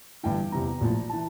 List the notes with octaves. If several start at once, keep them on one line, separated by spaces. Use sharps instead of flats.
G1 G2 E3 G5
E2 C3 E3 A#5
A#1 A2 F3
E3 A5